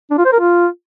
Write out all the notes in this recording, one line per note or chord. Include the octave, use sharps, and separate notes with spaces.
D4
F4
C5
A#4
F4